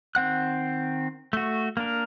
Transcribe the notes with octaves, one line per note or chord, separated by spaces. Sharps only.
D#3 C4 F#5 F#6
A3 F#4
A#3 D4 A#4